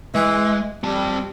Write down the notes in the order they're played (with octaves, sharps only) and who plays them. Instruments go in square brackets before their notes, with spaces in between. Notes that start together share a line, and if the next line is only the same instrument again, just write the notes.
[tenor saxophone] E3 [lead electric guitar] G#3
[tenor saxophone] G3 [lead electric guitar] C4 A5